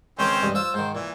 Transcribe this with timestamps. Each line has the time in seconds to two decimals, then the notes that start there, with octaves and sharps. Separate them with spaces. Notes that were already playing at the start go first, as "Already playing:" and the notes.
0.19 C#2 D#3 C4 C#4 C5 D6
0.42 A1 G2 G#3
0.55 F4 C5 E6
0.74 G#2 D#3 C5
0.95 A#2 E3